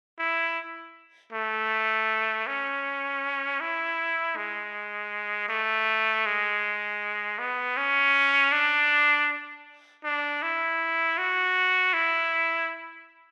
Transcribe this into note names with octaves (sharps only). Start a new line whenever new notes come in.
E4
A3
C#4
E4
G#3
A3
G#3
B3
C#4
D4
D4
E4
F#4
E4